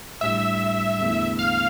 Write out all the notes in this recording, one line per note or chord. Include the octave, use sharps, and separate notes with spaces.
A2 G3 D4 E5
E2 D3 A3 E4
F5